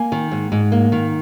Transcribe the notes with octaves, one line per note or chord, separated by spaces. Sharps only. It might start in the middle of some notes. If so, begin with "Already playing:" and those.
Already playing: A#3 G#5
D#3
G#2
G#2
A#3
D#3